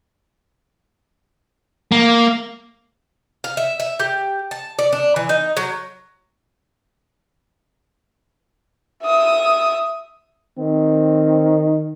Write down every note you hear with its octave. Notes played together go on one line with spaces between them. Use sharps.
A#3
F5
E5
E5
G4
A5
D5
D4
E3
D#4
F#3
E5 D#6
D#3 C4